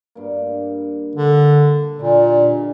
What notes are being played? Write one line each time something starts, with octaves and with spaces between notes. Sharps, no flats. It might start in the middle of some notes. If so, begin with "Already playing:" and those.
G2 A#3
D3
A#2 D3 G3 D#4